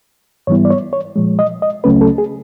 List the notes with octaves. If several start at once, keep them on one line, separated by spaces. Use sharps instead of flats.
G#2 E3 G3 B3 E4 C#5
D5
C#5
C#5
A#2 F3 G#3
D#5
D#5
C#2 C#3 F#3 A3 C#4 B4
A4
G#4